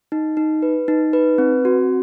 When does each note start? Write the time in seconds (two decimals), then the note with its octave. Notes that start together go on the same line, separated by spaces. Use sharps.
0.12 D#4
0.37 D#4
0.62 B4
0.88 D#4
1.13 B4
1.38 C4
1.65 F#4